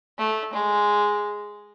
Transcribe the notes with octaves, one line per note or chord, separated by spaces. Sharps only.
A3
G#3